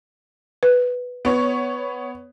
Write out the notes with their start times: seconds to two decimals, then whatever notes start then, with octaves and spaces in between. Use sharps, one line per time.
0.63 B4
1.25 B3 C#5